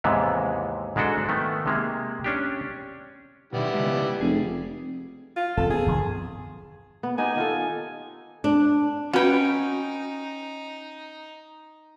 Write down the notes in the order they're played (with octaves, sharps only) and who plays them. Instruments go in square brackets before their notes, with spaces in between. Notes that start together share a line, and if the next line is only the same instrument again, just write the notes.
[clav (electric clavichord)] D#2 G#2 C3 E3 G#3 B3
G#2 G#3 D4 F#4 A4
D#3 A3 B3
C3 G#3 A#3
C#4 D4 G4
[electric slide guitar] B2 D#3 [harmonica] G3 B3 E4
[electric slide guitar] C#3 F3 G#3
[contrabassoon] F1 [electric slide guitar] G#4
[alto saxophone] F4
[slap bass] E1 C4 [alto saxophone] A4
[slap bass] B3 D4 [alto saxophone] G#4
[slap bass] F#2 D3 F3
[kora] B3
[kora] B3 D#4 G4 [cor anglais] G#5
[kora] D#3 F4 A4
[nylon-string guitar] D4
[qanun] C#4 G5 [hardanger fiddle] D#4 [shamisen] F#4 B4